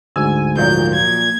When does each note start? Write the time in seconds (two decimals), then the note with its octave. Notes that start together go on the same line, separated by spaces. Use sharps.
0.16 D2 G#2 G#5 E6
0.57 A#2 F3 F#3 G6
0.94 G#6